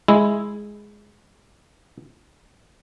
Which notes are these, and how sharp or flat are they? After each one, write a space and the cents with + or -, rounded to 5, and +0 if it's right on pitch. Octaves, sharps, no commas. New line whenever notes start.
G#3 +0 E4 +0